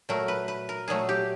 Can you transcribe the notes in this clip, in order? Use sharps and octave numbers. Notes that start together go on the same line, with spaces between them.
A#2 F#3 A3 A#4
B4
B4
A#4
A#2 F#3 A3 G#4
G4